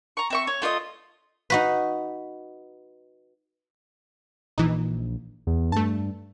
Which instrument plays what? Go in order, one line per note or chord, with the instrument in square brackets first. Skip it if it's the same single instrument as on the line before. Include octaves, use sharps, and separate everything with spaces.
[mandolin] A#5 C#6
C4 E5 C#6
C#5
A3 F4 C#5 D#5
[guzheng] D#4 F#4 B4
[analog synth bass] A#1 [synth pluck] E3 D#4
[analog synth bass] E2
[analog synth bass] G2 [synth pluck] A3 A5